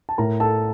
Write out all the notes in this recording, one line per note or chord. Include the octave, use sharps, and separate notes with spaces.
A5
A2 A#4 A#5
A4 A5